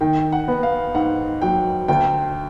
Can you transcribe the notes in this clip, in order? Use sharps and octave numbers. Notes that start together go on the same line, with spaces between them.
D#3 G5
F#5
B3
F5
G#2 F#5
F#3 G5
D2 G5